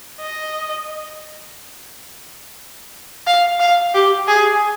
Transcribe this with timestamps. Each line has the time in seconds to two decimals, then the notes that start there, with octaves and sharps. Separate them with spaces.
0.20 D#5
3.27 F5
3.60 F5
3.95 G4
4.28 G#4